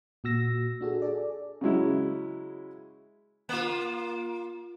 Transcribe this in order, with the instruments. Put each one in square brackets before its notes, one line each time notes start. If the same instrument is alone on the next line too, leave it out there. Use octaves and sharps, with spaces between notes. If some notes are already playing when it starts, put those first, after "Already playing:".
[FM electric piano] A#2 F#4 E6 A#6
D4 F#4 G#4 A4
G#4 A4 D5
[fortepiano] C#3 F#3 G#3 E4
[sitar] A#3 F4